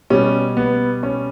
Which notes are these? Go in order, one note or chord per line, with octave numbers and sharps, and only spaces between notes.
B2 G3 C#4
B3
C#4